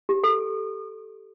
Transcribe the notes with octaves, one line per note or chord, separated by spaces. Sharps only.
G4
A4